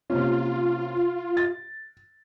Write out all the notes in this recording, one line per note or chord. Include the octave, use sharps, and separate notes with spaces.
C3 A#3 C#4 F4
A6